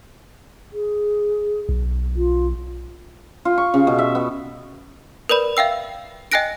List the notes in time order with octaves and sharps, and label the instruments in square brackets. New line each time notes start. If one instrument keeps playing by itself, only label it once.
[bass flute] G#4
[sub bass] B1
[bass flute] F4
[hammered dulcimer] F4
C#6
C#3
B2
E5
B3
[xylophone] A#4 B4 D5 B5
E5 F5 G5 E6
D#5 G5 G#5 F#6 A#6 D7